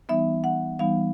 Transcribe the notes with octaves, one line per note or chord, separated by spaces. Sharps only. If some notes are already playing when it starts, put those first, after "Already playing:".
E3 G3 B3 D#4 E5
F#5
E3 G3 B3 D#4 F5